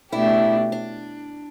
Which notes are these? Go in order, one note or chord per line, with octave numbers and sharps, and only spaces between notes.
B2 A3 D4 E4 G4
D4